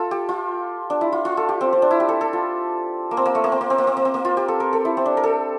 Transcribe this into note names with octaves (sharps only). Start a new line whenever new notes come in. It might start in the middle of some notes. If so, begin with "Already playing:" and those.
Already playing: F4 A4
G4
F4
D4
E4
F4
F4
A4
G4
C4
C4
D4
E4
G4
A4
A4
F4
A#3
C4
A#3
A3
A#3
C4
A#3
C4
A#3
C4
A#3
C4
A#3
F4
G4
A4
A#4
A4
E4
C4
D4
A#4
A4